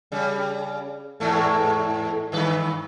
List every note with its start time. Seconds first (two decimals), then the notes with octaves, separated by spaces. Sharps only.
0.12 C#3 G3
1.20 E2 G#2 A3
2.32 G2 D#3 B4